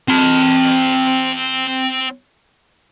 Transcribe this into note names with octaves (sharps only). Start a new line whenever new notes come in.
C4 A5